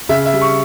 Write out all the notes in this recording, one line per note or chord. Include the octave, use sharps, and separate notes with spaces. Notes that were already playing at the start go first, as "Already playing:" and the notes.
C#3 E5
E5
G3
C#6